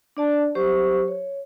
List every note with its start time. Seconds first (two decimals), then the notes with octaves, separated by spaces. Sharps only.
0.17 D4 D5 A5
0.55 F#3 G4 C5 C#6
1.08 C#5